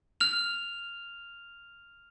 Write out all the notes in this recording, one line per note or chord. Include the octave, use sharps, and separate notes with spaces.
F6 F7